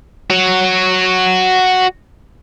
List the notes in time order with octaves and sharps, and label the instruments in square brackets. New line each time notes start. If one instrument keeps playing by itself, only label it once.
[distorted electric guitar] F#4 C#5